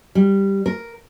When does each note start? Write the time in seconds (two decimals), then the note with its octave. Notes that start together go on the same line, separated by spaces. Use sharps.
0.15 G3
0.66 A#4